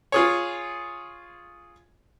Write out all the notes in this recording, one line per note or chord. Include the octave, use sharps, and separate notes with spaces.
F4 G#4 C#5